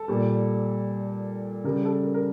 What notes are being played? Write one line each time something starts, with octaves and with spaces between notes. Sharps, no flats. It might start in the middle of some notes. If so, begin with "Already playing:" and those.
Already playing: A4
A#2 G3
C#3 G3 A#4
A4
A#4
A#4